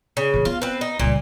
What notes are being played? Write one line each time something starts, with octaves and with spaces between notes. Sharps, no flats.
C#3
A#2 E3
B3 F4
C4 B4
D#4
C#2 A#2 G3